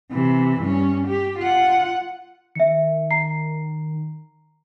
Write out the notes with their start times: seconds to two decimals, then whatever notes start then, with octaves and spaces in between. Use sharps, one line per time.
0.12 C3 E3
0.61 G2 C#4
1.07 G4
1.39 F4 F#5
2.55 D#3 E5 C#7
3.11 A#5 C7